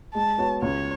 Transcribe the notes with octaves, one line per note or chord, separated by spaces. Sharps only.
G#3 A5
B3 F#4 C#5
C#2 C#5